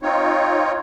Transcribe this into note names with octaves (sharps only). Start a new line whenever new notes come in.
C4 D#4 F4 C#5